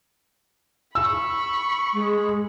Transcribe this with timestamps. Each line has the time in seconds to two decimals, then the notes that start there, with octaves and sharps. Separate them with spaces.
0.95 B5 C#6 E6
1.94 G#3